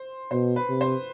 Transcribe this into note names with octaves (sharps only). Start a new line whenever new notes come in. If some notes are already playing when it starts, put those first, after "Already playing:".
Already playing: C5
B2 C5
B4
C3
C5